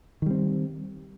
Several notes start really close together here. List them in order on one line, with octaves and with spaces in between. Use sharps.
D#3 G3 C4